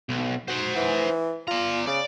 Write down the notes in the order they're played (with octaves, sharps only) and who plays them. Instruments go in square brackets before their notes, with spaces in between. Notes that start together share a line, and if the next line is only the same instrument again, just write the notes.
[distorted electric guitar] B1
[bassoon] F#4 [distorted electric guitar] C5 F#5
[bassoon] E3
[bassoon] F4 [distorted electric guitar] D5 A#5
[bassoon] C#3 [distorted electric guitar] D5